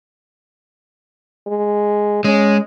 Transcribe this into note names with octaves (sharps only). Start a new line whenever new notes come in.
G#3
G#3 C#4